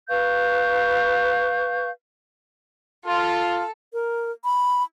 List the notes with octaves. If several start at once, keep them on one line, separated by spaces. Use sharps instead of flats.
B4 F5 C#6 G6
F4 A4
A#4
B5